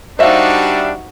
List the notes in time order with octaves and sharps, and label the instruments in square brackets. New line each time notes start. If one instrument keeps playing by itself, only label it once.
[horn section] G3 D4 [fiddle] D#4 F#4 [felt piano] C5 E5 F5